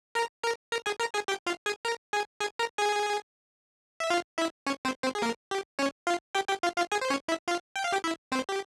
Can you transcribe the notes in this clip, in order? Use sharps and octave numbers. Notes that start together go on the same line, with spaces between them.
A#4 A#5
A#4 A#5
A#4 A#5
G#4 G#5
A#4 A#5
G#4 G#5
G4 G5
F4 F5
G#4 G#5
A#4 A#5
G#4 G#5
G#4 G#5
A#4 A#5
G#4 G#5
E5
F4 F5
E4 E5
C#4 C#5
C4 C5
C4 C5
G#4
A#3 A#4
G4
C#4 C#5
F4 F5
G4 G5
G4 G5
F4 F5
F4 F5
G#4 G#5
C5
C#4 C#5
E4 E5
F4 F5
G5
F5
G4 G5
E4 E5
C4 C5
G4